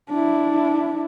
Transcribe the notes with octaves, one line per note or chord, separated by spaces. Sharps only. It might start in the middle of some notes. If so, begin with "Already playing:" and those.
D4 E4